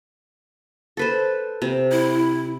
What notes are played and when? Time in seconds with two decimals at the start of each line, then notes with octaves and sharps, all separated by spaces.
0.97 A4 B4 C5
1.62 C3
1.92 E4